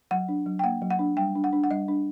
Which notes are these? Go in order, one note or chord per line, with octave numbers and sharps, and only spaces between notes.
F#3 F#5
D4
F#3
G5
A#3 F#5
F#3
F#5
D4
G3 G5
D4
F#5
D4
F#5
G3 D#5
D4